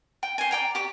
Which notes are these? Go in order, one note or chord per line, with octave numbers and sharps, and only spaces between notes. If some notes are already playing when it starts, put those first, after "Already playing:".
G5
C5 G#5
D5 G5 A#5
G4 D6